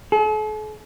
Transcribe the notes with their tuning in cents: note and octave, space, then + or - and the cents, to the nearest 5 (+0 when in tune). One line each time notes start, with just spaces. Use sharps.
A4 -45